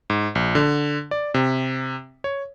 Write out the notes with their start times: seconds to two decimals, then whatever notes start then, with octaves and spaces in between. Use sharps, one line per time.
0.10 G#2
0.35 A#1
0.55 D3
1.11 D5
1.34 C3
2.24 C#5